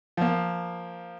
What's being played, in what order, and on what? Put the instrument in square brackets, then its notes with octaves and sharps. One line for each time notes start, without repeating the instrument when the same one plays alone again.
[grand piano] F3 A#3